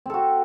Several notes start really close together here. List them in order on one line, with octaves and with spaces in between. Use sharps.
C4 A4 F#4